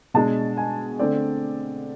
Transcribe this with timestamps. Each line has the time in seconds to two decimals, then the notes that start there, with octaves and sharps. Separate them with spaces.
0.14 B2 G#3 D4 A5
0.57 G#5
0.99 D3 A3 C4 D5